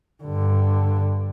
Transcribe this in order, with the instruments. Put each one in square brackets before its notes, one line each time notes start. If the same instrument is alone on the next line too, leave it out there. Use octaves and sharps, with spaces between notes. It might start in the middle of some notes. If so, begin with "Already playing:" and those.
[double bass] G2 D3